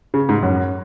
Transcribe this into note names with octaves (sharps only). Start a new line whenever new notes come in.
C#3
G#2
F#2